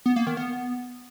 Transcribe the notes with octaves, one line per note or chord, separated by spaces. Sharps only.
B3
A#3
D#3
B3